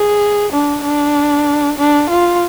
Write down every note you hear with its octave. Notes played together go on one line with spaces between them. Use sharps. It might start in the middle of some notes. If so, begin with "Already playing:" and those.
Already playing: G#4
D4
D4
D4
F4